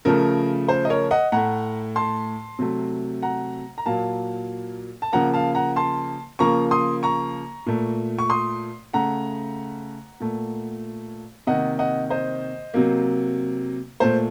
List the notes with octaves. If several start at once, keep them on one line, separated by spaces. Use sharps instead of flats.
C#3 F3 A3 A#4
C5
D#5
A#4 C#5
D#5 F#5
A2 A3 F#5 A#5
A5 C6
C3 F#3 A3
F#5 A#5
A#5
A#2 F#3 A#3 F5 A5
A5
C#3 F3 A#3 F#5 A#5
F5 A5
F#5 A#5
A5 C6
C#3 F3 A#3 A#5 C#6
C6 D#6
A#5 C#6
A#2 A3
C#6
C6 D#6
C#3 A3 F#5 A#5
A#2 A3
C3 D#3 A#3 D#5 F#5
D#5 F#5
C5 D#5
C3 F#3 A#3
A#2 A3 C5